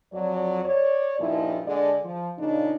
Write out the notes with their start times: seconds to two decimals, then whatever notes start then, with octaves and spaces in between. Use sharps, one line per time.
0.12 F2 F#3 D5
0.64 C#5 D5
1.20 G2 A#2 F3 D#4 E4
1.66 D3 G#3 D5
2.03 F3
2.38 A#2 C#3 D4 D#4